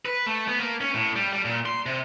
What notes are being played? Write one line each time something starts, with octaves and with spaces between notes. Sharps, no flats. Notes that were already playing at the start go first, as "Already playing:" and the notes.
B4
A3
B3
A#3
C#4
A2
G3
G3
A#2
C6
C3